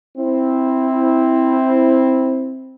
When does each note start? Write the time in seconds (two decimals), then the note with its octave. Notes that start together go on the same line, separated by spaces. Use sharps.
0.17 C4 E4